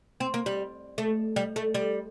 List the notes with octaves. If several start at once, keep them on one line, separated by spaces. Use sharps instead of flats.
C4
A#3
G3
A3
G3
A3
G3